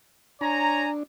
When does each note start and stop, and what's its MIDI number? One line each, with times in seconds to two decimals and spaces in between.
0.41 1.03 62
0.41 0.88 73
0.41 0.88 80
0.41 0.88 82